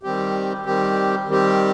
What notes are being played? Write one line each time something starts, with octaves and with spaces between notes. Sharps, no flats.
D#3 G3 C4 G4
D#3 G3 C4 G4
D#3 G3 C4 G4